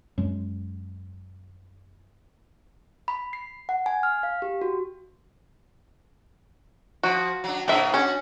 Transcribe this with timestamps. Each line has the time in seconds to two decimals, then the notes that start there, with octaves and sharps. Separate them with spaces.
0.18 F#2 G#3
3.08 B5
3.33 C7
3.69 F#5
3.86 G#5
4.03 F6
4.23 F5
4.42 G4
4.61 F#4
7.03 F3 F#4
7.44 F#3 D4
7.68 G#2 B2 A#3 D4 E5
7.94 C#4 D4 F#4